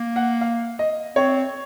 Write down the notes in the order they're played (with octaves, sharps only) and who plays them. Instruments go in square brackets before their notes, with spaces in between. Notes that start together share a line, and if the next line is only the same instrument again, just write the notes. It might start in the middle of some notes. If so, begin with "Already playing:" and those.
Already playing: [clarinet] A#3
[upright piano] F#5
F5
D#5
[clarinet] C4 [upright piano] C#5